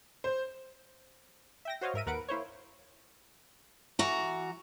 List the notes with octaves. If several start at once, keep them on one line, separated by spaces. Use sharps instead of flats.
C5
E5 G5 A#6
F#4 C5 C#5 D#5 F5
G#2 A#4 E5 D#7
D#2 A#4 B4 F#5 D7
A#3 E4 C5 C#5
E3 F#4 A#5